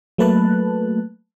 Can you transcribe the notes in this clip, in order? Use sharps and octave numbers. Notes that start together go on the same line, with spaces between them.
F#3 A3 A#3 B4 A5 F#6